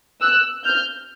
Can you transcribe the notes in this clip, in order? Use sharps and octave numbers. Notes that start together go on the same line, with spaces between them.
E6 F#6
F6 G6